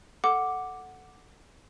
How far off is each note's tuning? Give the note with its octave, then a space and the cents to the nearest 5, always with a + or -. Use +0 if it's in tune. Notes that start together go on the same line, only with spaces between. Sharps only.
A4 +0 F#5 +0 D6 +0